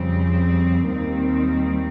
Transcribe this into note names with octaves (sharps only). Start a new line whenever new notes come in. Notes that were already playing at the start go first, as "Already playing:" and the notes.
Already playing: F2 C#3 G3 C4
D#2 D#3 G3 C4